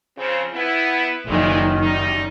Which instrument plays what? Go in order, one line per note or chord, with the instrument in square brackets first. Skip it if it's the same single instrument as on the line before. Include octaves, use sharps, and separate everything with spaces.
[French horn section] C#3 F3 C4
B3 E4
[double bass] F#1 D#3 [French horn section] A#2 E3 G#3
[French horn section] F#2 G3 D#4